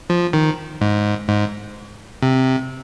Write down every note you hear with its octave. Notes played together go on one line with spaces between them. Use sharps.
F3
D#3
G#2
G#2
C3